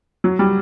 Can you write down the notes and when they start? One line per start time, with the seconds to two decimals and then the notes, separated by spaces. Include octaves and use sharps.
0.24 F#3
0.39 G3